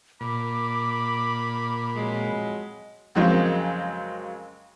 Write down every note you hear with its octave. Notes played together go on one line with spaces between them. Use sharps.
A#2 B5 D6
F2 F#3 G#3
F2 C#3 F#3 G#3 A#3 C4